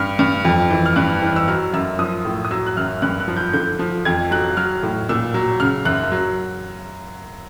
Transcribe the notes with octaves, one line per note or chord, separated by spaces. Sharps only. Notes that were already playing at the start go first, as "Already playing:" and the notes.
Already playing: G2 F6
G2
F2
E3
F6
G2 F#6
E3
E6
F#3 F6
F#2 E6
F3 D#6
A2
D#6
F#3 E6
F#6
F#2 F6
G2 F#6
F#6
F3
G6
D3 G6
F3
F2 G#6
F#3 F#6
F#3 F6
A2
A#2 E6
F#3
C#3 F6
F#2 F#6
F#3